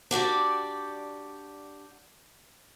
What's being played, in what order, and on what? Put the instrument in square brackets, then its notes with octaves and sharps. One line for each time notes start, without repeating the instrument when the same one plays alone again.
[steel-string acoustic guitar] D4 F#4 G4 D5